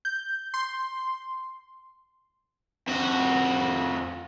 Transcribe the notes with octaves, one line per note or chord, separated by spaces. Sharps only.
G6
C6
F2 F#4